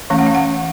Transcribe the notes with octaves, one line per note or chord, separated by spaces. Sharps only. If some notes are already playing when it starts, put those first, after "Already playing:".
E3 A3 C#4 F5
F#5
F5
F#5